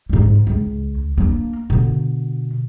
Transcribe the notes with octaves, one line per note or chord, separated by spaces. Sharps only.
G#2 G3
C#2
A#3 D4
B2 D3